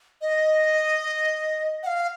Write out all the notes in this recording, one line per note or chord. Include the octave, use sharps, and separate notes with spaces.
D#5
F#5
F5